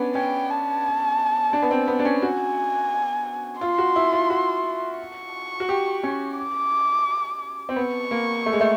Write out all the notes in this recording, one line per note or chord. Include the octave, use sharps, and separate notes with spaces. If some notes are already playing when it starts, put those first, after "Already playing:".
Already playing: B3 C#4 D4
C#4 G5
A5
D4
B3
C4
B3
D4
C#4
F#4 G#5
F4 C6
F#4
E4
F4
F#4
C#6
F#4
G4
C#4
D6
C4
B3 C#6
A#3
A3
G#3
A3